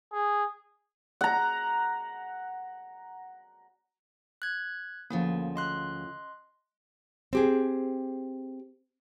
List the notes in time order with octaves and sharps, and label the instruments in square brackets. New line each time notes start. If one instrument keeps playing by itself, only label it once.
[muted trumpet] G#4
[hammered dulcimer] F#5 A#5
[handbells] F#6 G#6
[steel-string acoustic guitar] D2 C#3 F3 [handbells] A#3
[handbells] D#5 C6 F#6
[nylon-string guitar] C4 G4 G#4